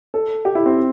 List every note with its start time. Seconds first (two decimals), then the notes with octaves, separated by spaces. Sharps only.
0.14 A4
0.45 G4
0.55 E4
0.66 C4